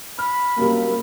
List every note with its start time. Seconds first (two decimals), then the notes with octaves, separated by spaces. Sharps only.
0.19 B5 F6
0.58 F#2 C3 G3 A#3